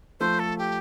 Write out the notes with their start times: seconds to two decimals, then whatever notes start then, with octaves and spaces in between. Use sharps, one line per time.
0.20 F3 A3 C5
0.39 A4
0.58 G4